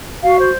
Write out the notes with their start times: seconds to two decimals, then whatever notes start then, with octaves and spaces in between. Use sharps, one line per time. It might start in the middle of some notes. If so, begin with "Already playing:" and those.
0.23 F#4 F5
0.38 C5